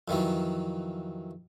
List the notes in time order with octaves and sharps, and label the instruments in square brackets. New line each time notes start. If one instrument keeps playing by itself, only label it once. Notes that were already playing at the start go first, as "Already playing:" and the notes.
[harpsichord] F2 D#3 E3 F#3